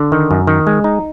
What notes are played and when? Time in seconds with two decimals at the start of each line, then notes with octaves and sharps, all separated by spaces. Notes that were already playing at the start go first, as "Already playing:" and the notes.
Already playing: D3
0.12 D#3
0.31 F#2
0.47 D#3
0.67 G#3
0.84 D#4